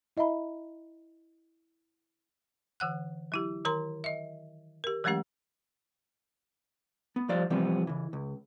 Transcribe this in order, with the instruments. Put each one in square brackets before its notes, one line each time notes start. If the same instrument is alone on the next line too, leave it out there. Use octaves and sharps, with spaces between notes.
[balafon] E4 D#5 E5 A#5 B5
[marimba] D3 E3 F#5 F#6
F#3 E4 G4
D#3 A#4 A#5 C6
D#5 E5
G4 A#4
E3 F#3 G#3 A3 C#4 G4
[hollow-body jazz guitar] B3
F3 G3 C5 D5 F5
C3 E3 F3 G3 B3 C4
C#3 E3
C#2